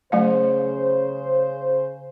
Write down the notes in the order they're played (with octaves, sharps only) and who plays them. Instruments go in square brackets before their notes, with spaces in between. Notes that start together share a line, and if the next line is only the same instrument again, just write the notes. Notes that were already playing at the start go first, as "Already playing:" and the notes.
[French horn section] C#3 C5 [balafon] F#3 A3 F5